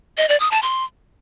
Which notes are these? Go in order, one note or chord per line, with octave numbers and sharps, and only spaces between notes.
D#5
D5
D#6
A5
C6